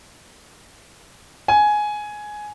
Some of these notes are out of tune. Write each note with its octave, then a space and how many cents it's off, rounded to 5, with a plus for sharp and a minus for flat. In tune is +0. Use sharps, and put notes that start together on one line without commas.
G#5 +10